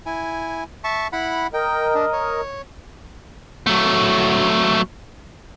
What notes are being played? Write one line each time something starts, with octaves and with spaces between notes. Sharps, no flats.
E4 G#5
E5 A5 C#6
E4 F#5 B5
A#4 D#5 G5
D4
C#5
F#3 A3